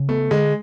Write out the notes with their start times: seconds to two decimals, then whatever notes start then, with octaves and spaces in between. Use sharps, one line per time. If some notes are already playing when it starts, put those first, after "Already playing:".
Already playing: C#3
0.09 A3 B3
0.31 D3 G#3